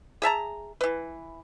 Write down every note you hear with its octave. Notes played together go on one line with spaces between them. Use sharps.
G#4 E5 A5 A#5
E3 B4